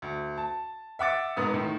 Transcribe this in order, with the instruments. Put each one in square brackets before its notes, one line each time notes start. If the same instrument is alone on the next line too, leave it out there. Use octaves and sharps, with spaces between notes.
[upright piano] D2
A5
E5 F#5 D6 A6
E1 G#2 B3 D#6
A2 D#3